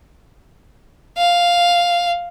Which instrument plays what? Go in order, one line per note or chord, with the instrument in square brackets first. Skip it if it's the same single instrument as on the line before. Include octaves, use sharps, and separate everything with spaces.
[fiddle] F5